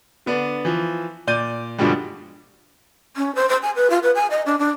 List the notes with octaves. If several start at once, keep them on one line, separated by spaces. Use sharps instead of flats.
D3 B3 D4
E3 F3
A#2 D5 G6 A6 D#7
G2 B2 D3 F3 G3 G#3
C#4
C5
C5
G#5
B4
F4
B4
G#5
D#5
D4
D4